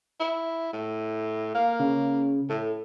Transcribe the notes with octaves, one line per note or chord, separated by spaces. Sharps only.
E4
A2
A#3 F5
C#3
A2 A4